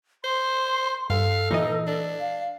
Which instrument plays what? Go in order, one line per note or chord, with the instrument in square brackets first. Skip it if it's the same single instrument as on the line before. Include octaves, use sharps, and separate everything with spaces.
[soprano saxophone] C5 [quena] C6
[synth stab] G2 [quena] A4 [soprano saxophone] F5
[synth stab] A#2 E3 D#5 [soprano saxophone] D#4
[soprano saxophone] D4
[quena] F5